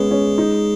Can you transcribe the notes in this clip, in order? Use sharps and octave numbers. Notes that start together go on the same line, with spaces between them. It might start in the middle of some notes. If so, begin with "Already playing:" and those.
Already playing: G#3 B3 C#4 G#4
C#4
D#4